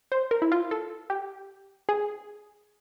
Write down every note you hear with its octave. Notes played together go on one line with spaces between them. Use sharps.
C5
A#4
E4
F4
A4
G4
G#4